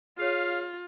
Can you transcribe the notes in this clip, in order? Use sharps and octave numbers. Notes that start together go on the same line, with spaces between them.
F4 G#4 C#5 F5